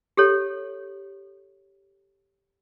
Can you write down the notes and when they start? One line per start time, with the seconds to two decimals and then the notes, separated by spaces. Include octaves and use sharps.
0.17 G4 A4 C#5